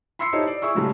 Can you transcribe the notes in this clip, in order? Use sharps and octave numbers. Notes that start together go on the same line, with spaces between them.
B5 C6 E6 C7 C#7
D#4 E4 G4 A4 C5 C#5
D5
E4 G#4 C#6 E6
G#2 C#3 F#3 G3 A3